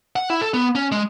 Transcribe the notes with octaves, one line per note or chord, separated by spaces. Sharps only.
F#5
E4
A4
B3
C#4
G#3